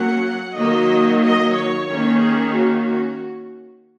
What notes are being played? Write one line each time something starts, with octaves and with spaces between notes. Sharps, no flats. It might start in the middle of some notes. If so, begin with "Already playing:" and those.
Already playing: F#3 A#3 C#4 F#5
D#3 F#3 A#3 D#5
D#5
C#5
D#3 A#3 C#4
G#4
F#4
F#4